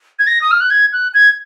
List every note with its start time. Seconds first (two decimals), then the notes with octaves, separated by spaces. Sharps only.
0.19 G#6
0.27 A#6
0.42 D#6
0.51 F6
0.61 F#6
0.70 G#6
0.93 F#6
1.14 G#6